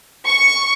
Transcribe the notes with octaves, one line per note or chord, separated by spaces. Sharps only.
C#6